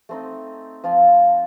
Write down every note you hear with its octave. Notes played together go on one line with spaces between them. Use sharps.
A3 C4 D#4
F3 C4 F4